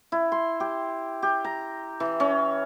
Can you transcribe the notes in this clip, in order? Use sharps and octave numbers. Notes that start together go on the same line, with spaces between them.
E4
C6
G4
G4
A#5
E3
C#4